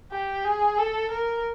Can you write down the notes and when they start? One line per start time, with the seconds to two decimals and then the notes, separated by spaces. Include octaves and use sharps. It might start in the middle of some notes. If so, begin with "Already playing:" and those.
0.12 G4
0.45 G#4
0.78 A4
1.11 A#4